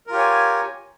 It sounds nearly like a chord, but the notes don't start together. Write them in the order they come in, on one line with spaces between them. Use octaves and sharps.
A#4 F4 G4 C#5 G#5